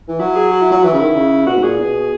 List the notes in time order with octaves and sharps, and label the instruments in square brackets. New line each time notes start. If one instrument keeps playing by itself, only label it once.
[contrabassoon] E3
[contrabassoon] F#3 [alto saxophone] E4
[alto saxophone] G#4
F#4
E4
[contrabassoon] F#3 [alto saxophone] F#4
[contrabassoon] E3 [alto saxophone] E4
[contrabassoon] C#3
[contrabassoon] D#3 [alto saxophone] E4
[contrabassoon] C#3
[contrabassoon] B2 [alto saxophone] F#4
[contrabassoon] G#2
[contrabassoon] A#2 [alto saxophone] G#4
[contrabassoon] B2